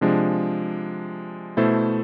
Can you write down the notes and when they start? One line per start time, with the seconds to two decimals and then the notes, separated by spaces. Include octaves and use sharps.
0.01 C3 F3 G#3 D4
1.57 B2 A3 E4 A4 C5